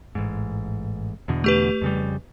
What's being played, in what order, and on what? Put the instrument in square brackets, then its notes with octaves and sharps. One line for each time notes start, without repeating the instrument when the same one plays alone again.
[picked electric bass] A1 G#2
E2 B2 D3
[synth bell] A3 G4 B4
[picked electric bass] F2 C#3 G3